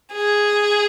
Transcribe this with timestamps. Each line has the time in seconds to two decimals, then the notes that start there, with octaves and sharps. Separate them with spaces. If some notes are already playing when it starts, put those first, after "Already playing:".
0.13 G#4